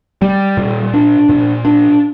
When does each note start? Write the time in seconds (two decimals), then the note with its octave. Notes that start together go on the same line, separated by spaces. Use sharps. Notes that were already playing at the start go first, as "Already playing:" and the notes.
0.22 G3
0.57 A#2
0.94 D4
1.29 A#2
1.65 D4